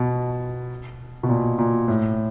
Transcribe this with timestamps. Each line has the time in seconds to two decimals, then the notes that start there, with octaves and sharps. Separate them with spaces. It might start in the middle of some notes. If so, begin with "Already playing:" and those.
Already playing: B2
1.23 B2
1.29 A#2
1.58 A#2
1.88 A2